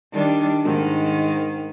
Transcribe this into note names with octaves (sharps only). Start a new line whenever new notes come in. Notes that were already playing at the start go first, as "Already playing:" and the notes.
D#3 G3 D4
G#2 D#3